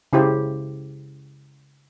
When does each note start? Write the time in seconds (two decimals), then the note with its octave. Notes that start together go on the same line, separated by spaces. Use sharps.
0.13 C#3 E4 G4 C5